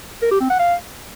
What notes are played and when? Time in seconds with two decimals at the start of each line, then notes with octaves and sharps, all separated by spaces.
0.22 A#4
0.31 G4
0.41 C4
0.50 F#5
0.59 F5